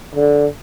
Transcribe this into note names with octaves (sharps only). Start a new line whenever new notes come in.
D3